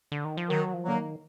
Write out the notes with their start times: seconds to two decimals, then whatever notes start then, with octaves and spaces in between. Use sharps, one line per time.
0.12 D3
0.25 D#3
0.37 F3
0.49 D#3 F#3
0.74 F3
0.84 D3 F#3 A#3
0.95 D#3